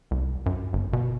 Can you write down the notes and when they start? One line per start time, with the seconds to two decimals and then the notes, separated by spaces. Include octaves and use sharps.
0.11 C2
0.46 F#2
0.73 G1
0.93 B2